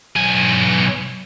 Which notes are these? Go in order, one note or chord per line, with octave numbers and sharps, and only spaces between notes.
B1 G#5